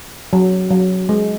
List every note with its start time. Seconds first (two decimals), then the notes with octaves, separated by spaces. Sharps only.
0.33 F#3
0.71 F#3
1.09 G#3